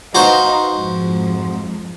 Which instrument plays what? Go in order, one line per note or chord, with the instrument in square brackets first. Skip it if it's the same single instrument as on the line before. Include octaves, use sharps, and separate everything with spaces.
[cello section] D#4 B4 F5 [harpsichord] F#4 C5
[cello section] F2 G#2 F3